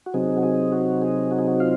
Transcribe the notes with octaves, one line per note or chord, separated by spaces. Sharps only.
F#4
C3 F#3 C4 D#4 G#4
F#4
G#4
F#4
G#4
F#4
G#4
F#4
F4 F5